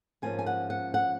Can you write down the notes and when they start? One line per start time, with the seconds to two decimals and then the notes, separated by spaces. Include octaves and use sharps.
0.22 G#2 F3 A#3 C#4 G#5
0.39 G#5
0.46 F#5
0.70 F#5
0.94 F#5